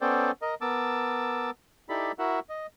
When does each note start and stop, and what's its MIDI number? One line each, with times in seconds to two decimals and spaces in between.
0.01 0.31 59
0.01 0.31 61
0.01 0.31 69
0.01 0.31 72
0.01 0.31 74
0.01 0.31 79
0.42 0.55 70
0.42 0.55 75
0.61 1.50 59
0.61 1.50 70
0.61 1.50 81
0.61 1.50 86
0.61 1.50 88
1.89 2.12 63
1.89 2.12 64
1.89 2.12 67
1.89 2.12 69
1.89 2.12 74
1.89 2.12 83
2.19 2.39 64
2.19 2.39 66
2.19 2.39 70
2.19 2.39 76
2.19 2.39 78
2.49 2.67 75